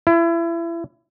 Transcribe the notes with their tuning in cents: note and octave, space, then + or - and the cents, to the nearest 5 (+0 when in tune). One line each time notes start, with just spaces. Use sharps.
E4 +30